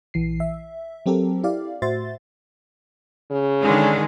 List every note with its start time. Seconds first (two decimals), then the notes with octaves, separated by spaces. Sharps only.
0.14 A#1 E3 C7
0.40 E5
1.06 F#3 C4 G4 A4 A#4
1.44 E4 G4 D5 F5
1.82 A2 F#4 C5 E5 C6 A6
3.31 C#3
3.62 D3 D#3 G#3